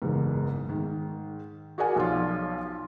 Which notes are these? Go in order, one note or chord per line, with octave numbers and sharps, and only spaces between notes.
F#1 E2 G#2
G#2 D#3
F#4 G#4 A#4 D5 F#5 G#5
B1 F3 F4